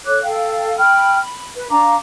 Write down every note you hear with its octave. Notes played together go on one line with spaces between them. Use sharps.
A4 C#5 D6 F#6
A4 F5 G5
G5 B5 F6
B5
B4
D4 F5 A#5 D6